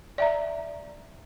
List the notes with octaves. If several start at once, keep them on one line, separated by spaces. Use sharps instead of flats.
D5 E5 A#5